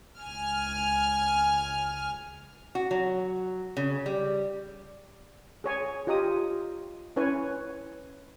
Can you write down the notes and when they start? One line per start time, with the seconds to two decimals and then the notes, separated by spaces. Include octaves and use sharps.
0.20 C#2 G#5 F6
2.75 F#4
2.91 F#3
3.77 C#3
4.06 G3
5.64 G#4 C#5 G#5
6.07 F4 G4 D#5 A#5 D#6
7.16 C#4 E4 B4 C#5 G#5